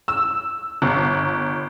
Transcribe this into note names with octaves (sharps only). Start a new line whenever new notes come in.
E6
G1